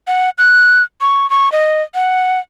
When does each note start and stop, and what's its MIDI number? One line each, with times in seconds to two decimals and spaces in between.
0.07 0.30 78
0.38 0.83 90
1.01 1.29 85
1.30 1.52 85
1.52 1.82 75
1.95 2.39 78